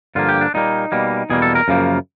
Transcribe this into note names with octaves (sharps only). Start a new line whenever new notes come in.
G2 D3 F3 A#3 F4
G4
D4
A#2 G3 A#3 D#4
B2 G3 A#3
E2 B2 G3 A#3 G#4
A4
A#4
F#2 C#3 F3 A#3